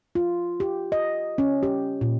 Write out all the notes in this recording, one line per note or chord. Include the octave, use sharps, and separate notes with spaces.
F4
G4
D#5
C#4
G4
A#2